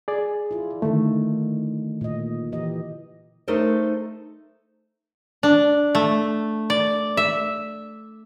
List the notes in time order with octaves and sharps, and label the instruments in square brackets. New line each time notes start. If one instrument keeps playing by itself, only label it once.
[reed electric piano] G#4 D5
[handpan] E4 F4
[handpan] D3 D#3 [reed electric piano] A3
[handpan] A#2 D#5
E3 G4 D#5
[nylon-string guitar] A3 D#4 A4 A#4 C5
[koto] D4
A3
D5
E5